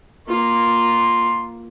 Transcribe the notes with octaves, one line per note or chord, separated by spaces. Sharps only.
A#3 F4 C6